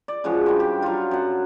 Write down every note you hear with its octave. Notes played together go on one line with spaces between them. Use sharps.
D5
C#3 F3 G#3 F#4
G2 G5
G4
F#3 F4
F#2 F#5